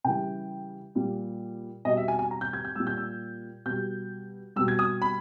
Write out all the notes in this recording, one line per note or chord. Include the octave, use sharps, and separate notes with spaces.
C#3 E3 G3 G5
A#2 G3
B2 G3 D#5
E5
G#5
G#5
A#5
G6
G#6
G6
A#2 G3 E6
G6
E6
B2 G3 G6
B2 G3 E6
G#6
D#6
B5